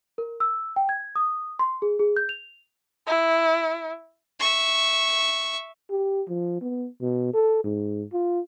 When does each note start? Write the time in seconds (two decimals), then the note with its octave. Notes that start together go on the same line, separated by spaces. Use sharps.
0.18 A#4
0.40 E6
0.76 G5
0.89 G#6
1.16 D#6
1.59 C6
1.82 G#4
1.99 G#4
2.16 G6
2.29 F7
3.07 E4
4.40 E5 C#6
5.91 G4
6.29 F3
6.62 B3
7.01 B2
7.34 A4
7.64 G#2
8.13 F4